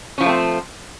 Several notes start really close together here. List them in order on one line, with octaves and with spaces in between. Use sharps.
C#4 F3 F4 A3 C4